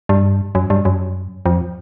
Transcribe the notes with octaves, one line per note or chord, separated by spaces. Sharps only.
G2
F#2
G2
F#2
F2